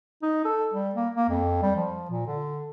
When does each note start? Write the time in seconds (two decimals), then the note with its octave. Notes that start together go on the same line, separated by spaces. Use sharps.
0.23 D#4
0.45 A4
0.74 G3
0.95 A#3
1.16 A#3
1.29 F2
1.62 G3
1.76 F3
2.10 A#2
2.27 D3